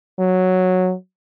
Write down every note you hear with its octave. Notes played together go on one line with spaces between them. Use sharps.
F#3